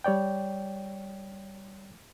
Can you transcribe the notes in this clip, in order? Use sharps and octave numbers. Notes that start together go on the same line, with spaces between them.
G3 C#5 D5 G5